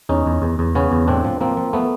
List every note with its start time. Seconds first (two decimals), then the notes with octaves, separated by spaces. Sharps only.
0.09 E2 C#4 D#4
0.26 E2
0.42 E2
0.59 E2
0.75 C#3 B3 C#4
0.92 E2
1.07 A2 C4 D4
1.24 F3
1.41 F3 A#3 C4
1.57 F3
1.73 F3 A3 B3